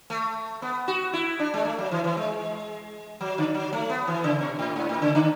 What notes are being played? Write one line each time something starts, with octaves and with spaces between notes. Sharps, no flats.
A3
B3
F#4
E4
D4
G#3
A3
F#3
E3
E3
G#3
F#3
D3
F#3
A3
B3
E3
C#3
B2
A2
G#2
A2
C#3
D3